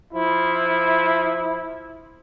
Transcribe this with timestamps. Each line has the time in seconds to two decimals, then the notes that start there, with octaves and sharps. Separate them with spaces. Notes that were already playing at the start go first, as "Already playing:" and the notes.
0.13 F3 E4